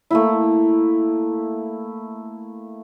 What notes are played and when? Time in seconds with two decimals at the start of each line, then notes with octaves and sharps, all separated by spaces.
0.11 A3 A#3 E4